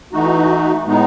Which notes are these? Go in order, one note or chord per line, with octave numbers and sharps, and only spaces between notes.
E3 A3 D#4 F#4
A2 G#3 B3 D#4